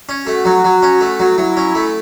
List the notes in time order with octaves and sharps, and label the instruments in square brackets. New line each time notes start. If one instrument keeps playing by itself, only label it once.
[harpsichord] C#4
[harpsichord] A3 [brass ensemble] F#4
[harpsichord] F#3
F#3
C#4
A3
F#3
[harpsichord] F#3 [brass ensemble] E4
[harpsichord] C#4
A3